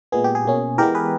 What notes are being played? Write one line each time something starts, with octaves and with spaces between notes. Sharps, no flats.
A#2 G#3 B3 G#4
G4
G#4
B2 A#3 C#4
E3 G#3 B3 G4 A#4
G#4 B4